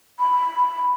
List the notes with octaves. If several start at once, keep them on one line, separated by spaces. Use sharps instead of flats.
B5